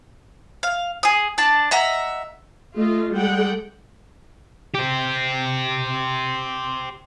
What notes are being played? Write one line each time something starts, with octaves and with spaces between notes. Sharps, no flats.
F5
G#4 D#6
D4 D5 A5
D#5 E5 F#5 A#5
A3 F4 D#5
G3 G#3 A4 F#5 G5
G4 C5